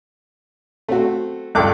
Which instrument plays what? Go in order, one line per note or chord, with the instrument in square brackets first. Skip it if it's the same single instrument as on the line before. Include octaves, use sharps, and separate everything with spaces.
[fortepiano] A3 C4 F#4
[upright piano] C#2 G2 [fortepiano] A4 D6 F#6